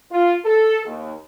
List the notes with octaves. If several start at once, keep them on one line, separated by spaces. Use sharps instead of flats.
F4
A4
D#2